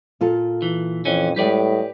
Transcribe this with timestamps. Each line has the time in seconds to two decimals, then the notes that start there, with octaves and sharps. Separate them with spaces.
0.21 A#2 F4 A4
0.62 E3
1.05 F2 E3 C#4
1.36 A2 G3 G#3 G4 B4 D5